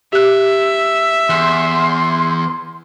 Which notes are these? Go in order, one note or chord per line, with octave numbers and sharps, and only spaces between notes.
G4 E5 F#6
E2 C6